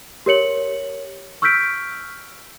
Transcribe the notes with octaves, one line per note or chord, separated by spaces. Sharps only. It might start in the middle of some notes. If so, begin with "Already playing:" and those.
G4 A#4 C#5 C#7 F#7
C#6 E6 F6 G6 B6 D7